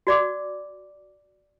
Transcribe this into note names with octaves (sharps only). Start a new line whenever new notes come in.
F#4 D5 D6